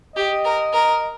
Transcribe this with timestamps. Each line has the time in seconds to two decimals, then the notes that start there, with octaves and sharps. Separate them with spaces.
0.16 G4 D#5
0.45 A#4
0.73 A#4